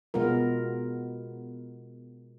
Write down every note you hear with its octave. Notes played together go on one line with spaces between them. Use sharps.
B2 G#3 B3 F4 A#4